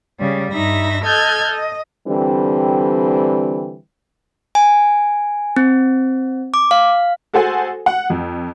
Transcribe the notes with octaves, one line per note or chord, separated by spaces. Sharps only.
C#3 G3
G2 D#4 E5 B5 A#6
A4 D#5 F6 G6 G#6
D#5
D3 E3 G3 C4
G#5
C4
D6
F5
F#4 G#4 A4 C5 F#5 G#5
F#5
F2